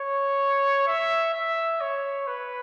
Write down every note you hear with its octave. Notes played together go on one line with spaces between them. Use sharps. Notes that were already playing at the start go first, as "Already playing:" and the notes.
Already playing: C#5
E5
E5
C#5
B4